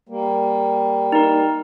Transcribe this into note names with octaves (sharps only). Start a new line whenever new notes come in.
G3 A#3
D#4 A#4